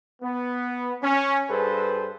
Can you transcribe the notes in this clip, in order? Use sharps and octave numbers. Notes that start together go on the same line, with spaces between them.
B3
C#4
G2 G#4 A4 B4 C5